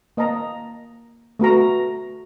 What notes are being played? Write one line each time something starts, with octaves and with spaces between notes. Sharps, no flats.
A#3 D#5 A5 A#5
A3 B3 F#4 A#5